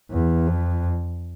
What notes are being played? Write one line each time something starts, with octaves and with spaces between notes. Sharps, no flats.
E2
F2